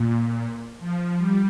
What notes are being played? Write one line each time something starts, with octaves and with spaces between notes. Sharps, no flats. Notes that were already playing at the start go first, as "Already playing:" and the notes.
Already playing: A#2
F3
G3